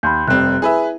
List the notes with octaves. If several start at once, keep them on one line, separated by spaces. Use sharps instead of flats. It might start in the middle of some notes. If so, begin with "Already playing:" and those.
D#2 B5 C6 G6
F1 G3 C4 F#6
E4 G#4 B4 E5